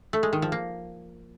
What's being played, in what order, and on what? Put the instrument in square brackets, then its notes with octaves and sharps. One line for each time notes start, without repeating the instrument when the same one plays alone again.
[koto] A3
G#3
D#3
F3
A#3